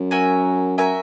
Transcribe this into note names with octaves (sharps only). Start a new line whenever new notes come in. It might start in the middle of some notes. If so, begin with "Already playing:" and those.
Already playing: F#2
F#4 A#4 E5 G#5
F#4 A#4 E5 G#5